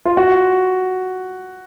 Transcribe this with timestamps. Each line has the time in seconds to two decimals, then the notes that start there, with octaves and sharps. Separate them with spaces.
0.05 F4
0.17 F#4